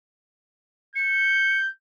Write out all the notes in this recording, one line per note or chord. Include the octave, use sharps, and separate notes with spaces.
G6 C#7